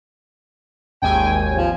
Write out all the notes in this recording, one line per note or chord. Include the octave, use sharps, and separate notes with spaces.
G#1 D#2 G5 G#5
F3